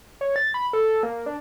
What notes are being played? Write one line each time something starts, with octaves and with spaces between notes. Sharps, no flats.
C#5
A6
B5
A4
A#3
D4